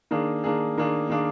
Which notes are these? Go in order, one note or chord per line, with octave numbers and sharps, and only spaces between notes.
D#3 A#3 D4 G#4
D#3 A#3 D4 G#4
D#3 A#3 D4 G#4
D#3 A#3 D4 G#4